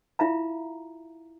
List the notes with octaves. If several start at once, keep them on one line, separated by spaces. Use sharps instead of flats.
E4 F4 E5 F5 A#5